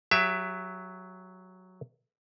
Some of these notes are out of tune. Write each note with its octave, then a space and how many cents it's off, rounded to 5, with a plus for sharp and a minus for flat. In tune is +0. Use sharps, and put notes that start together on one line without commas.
F#3 +0 G4 +30 E5 +25